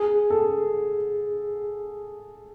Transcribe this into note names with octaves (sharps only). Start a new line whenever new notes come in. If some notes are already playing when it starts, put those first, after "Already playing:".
Already playing: G#4
A4